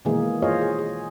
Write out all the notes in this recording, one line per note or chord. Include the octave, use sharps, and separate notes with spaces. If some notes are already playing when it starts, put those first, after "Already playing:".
B2 D#3 E3 G#3 A#3 G#4
F4 G#4 C5 C#5 D#5 F5
G#4
G#4